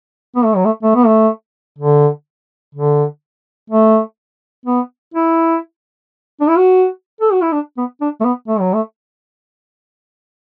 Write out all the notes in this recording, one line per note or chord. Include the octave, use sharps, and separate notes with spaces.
B3
A3
F#3
A3
A3
B3
A3
D3
D3
A3
B3
E4
D4
E4
F#4
A4
F#4
E4
D4
B3
D4
A3
B3
A3
F#3
A3